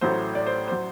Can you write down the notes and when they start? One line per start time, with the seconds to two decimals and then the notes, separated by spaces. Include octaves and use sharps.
0.01 A1 A2 F#3 C5
0.35 D5
0.46 C5
0.68 F#3 C5